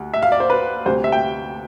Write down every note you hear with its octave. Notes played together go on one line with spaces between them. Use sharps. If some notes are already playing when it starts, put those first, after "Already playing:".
Already playing: D2 G3
E5
F5
D5
C5
B4
D2 C3 G3 C5
E5
G5